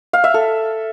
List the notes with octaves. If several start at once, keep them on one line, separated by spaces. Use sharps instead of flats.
F5
E5
A4